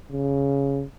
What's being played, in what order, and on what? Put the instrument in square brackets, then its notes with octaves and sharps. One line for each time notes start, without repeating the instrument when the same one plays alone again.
[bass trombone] C#3